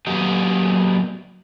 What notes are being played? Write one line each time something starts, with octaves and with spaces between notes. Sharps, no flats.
F#3 A#3 B3 G4 D#5